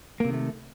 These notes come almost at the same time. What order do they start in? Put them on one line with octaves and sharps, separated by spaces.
A#3 C3 D#3 A3